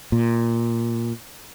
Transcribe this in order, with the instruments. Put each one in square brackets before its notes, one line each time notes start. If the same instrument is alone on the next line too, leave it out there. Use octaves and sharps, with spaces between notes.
[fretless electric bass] A#2